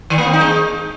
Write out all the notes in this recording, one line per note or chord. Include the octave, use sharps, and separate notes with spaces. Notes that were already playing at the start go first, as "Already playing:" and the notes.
D#3
A#3
C4
D#4
G#3